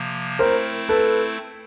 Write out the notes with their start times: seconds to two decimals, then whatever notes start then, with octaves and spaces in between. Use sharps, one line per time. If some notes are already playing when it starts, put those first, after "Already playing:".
Already playing: C3 F3 A#3
0.39 A3 C4 E4 A#4 C5
0.89 A4 B4